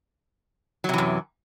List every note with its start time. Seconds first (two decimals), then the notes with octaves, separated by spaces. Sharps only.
0.84 F#3
0.89 C3
0.94 E3
0.98 F#2